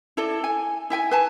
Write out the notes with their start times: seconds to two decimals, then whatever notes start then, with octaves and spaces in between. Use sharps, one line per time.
0.17 E4 A4 D5
0.44 G#5
0.90 E4 E5 G5 G#5
1.11 B4 G#5 A5